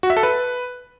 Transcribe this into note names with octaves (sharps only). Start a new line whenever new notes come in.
F#4
E5
A4
B4